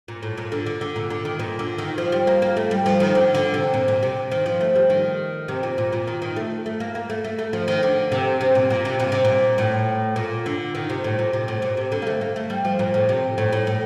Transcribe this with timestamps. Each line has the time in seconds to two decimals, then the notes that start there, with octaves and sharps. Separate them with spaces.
0.08 A#2
0.23 A2
0.37 A#2
0.52 D3
0.66 D3
0.81 D3
0.96 A#2
1.10 D3
1.25 D#3
1.39 A#2
1.59 D3
1.78 D#3
1.98 F3
2.12 G3
2.27 A#3
2.42 A#3
2.57 A3
2.71 G3
2.86 F3
3.00 D#3
3.15 D3
3.34 D3
3.54 C3
3.74 A#2
3.88 A#2
4.03 C3
4.32 D#3
4.46 F3
4.61 A3
4.76 G3
4.90 D#3
5.48 C3
5.63 A#2
5.78 A#2
5.92 A#2
6.07 D#3
6.22 D#3
6.36 A3
6.66 A3
6.80 A#3
6.95 A#3
7.10 A3
7.24 A3
7.39 A3
7.53 F3
7.68 D#3
7.83 D3
8.12 C3
8.41 C3
8.55 A#2
8.70 A#2
8.85 C3
8.99 A#2
9.12 C3
9.25 A#2
9.58 A2
10.16 A#2
10.46 D3
10.75 D#3
10.89 C3
11.04 A2
11.19 A#2
11.33 C3
11.48 A2
11.62 A#2
11.77 C3
11.92 D3
12.02 A#3
12.07 A3
12.21 A#3
12.36 A3
12.50 G3
12.65 F3
12.79 A#2
12.94 A2
13.09 C3
13.38 A2
13.52 A2
13.67 A2